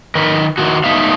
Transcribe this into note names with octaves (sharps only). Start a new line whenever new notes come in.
D#3 A#4 B4
D#3 E4 F#4
A3 B3 D#4 E5 F5